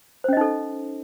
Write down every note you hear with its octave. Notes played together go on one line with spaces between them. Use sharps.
C#4 D#4 A4 C5 D#5